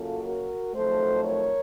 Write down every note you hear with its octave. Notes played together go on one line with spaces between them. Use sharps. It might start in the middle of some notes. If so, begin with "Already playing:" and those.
Already playing: F#2 C#3 F#3 A#3 F4 A4
F#4 A#4
F2 D#3 F#3 A3 A4 C5
A#4 C#5